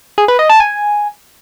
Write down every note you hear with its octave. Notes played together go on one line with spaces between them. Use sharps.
G#4
B4
D#5
A5
G#5